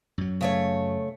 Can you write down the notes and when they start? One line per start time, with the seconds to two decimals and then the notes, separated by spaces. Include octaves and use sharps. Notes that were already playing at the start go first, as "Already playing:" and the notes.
0.18 F#2 F#3
0.41 C#3 A3 C#5